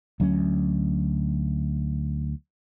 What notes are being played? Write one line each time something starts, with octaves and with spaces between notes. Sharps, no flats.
D2 F#3 B3 C#4